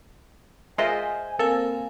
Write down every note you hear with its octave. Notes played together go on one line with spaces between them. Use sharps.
G#3 F4 A#4 C5 D#5 E5 G#5
A#3 C4 A4 A#4 F5 G#5